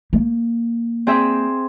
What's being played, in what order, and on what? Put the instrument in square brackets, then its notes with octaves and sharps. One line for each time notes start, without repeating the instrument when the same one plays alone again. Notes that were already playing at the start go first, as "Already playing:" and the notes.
[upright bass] A#3
[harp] C4 G#4 E5